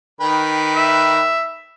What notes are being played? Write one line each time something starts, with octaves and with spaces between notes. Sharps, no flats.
D#3 B4 G5
E5